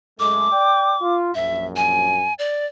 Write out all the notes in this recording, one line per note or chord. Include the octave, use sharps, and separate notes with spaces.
F#2 G#3 A3 D6
D5 G5
F4
A#1 F#2 E5
G#5
D5